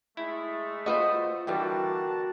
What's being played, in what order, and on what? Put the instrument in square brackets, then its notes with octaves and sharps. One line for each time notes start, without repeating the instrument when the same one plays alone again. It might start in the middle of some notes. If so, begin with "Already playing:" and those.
[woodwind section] G#3 A3 [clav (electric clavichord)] E4
[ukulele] F4 D#5 [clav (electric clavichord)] F#4 B4 C5
[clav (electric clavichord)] D3 E3 G3 [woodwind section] A#3 D4 A5 [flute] F#4 [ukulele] G5